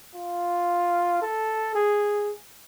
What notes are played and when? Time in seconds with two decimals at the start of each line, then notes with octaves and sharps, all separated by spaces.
0.15 F4
1.22 A4
1.75 G#4